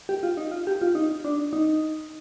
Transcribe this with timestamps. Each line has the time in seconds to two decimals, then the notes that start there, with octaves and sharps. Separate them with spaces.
0.09 G4
0.23 F4
0.37 D#4
0.51 F4
0.67 G4
0.82 F4
0.95 D#4
1.24 D4
1.53 D#4